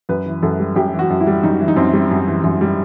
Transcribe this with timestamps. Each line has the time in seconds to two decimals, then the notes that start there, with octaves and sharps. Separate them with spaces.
0.09 F#2 B4
0.26 E3
0.43 F#2 A4
0.59 G3
0.76 F#2 G4
0.93 E3
0.99 F#4
1.10 F#2
1.20 E4
1.27 G3
1.43 F#2 D#4
1.60 E3
1.68 D#4
1.76 F#2 C4
1.93 G3
2.11 F#2
2.27 E3
2.44 F#2
2.61 G3